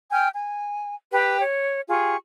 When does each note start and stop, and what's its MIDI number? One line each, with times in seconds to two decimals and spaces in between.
0.11 0.28 79
0.11 0.28 80
0.11 0.28 89
0.11 0.28 91
0.34 0.95 80
1.12 1.41 67
1.12 1.41 71
1.12 1.41 79
1.41 1.80 73
1.89 2.16 65
1.89 2.16 67
1.89 2.16 68
1.89 2.16 85